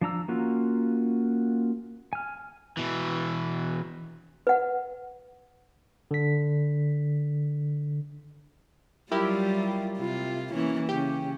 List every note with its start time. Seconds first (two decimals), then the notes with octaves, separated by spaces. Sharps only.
0.01 F3 D4 A#5 E6
0.28 A#3 C#4 F4 F#4
2.13 G#5 F6
2.77 B2 E3
4.47 B4 F#5
6.11 D3 B6
9.11 F#3 G3 E4 F4 G4 A#4
9.97 C3 F4
10.53 E3 A#3 C#4
10.89 C#3 C#4 G4